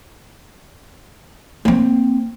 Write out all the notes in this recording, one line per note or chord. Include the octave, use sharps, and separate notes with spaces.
A#3 C4